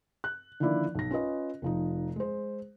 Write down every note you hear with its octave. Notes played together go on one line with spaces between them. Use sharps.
F#6
D3 D#3 F3 A#3 E4 D5
B1 A#6
C#4 F4 B4 D#5
F1 F3 D#4
G#3 C5